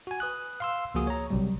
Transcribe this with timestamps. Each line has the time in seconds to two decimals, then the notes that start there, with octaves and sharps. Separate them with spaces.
0.07 F#4 G#5
0.20 B4 D#6 F#6
0.60 F5 C6 E6
0.94 C#2 F3 A#3 F#4 G#4 D#6
1.07 C#5 A#5
1.30 A#1 C3 F#3 G3